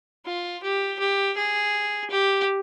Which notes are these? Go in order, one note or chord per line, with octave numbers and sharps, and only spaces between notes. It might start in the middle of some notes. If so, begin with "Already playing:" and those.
F4
G4
G4
G#4
G4